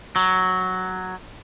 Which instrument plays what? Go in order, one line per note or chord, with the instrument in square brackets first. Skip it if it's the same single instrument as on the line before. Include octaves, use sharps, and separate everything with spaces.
[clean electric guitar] F#3